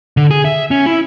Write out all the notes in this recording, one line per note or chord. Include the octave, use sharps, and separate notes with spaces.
D3
G#4
E5
C#4
E4